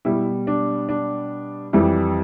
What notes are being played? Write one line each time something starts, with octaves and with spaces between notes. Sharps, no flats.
B2 G3 E4
D4
D4
F2 E3 G3 E4